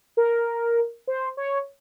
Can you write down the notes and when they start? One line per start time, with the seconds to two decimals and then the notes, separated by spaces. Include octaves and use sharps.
0.17 A#4
1.08 C5
1.37 C#5